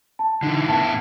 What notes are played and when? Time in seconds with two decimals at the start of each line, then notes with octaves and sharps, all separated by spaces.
0.19 A5
0.43 D3 E3 D#4
0.68 A2 B3 E4 A5